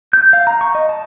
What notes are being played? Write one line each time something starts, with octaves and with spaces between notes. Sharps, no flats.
G6
F5
A#5
C#6
D#5
A5